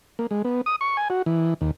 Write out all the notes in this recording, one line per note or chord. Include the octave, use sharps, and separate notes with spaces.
A#3
G#3
B3
D#6
C#6
G#5
F#4
E3
D#2